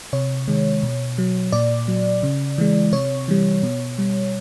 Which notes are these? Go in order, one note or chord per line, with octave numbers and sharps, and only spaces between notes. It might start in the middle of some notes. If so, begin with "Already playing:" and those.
C3 C#5
D#3 G#3
B2
F#3
A#2 D5
F#3
C#3
E3 G#3
C3 C#5
E3 G3
B2
G3